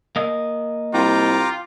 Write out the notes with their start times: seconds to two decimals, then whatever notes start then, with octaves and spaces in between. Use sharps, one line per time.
0.16 A#3 D#5
0.94 C2 F4 G5 A#5 D6